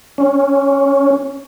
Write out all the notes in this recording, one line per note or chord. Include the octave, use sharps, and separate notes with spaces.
C#4